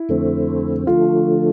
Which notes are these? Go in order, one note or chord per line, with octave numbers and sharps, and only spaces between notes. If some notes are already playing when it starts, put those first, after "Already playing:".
Already playing: E4
F2 D3 A3 C4
D3 F3 A3 F4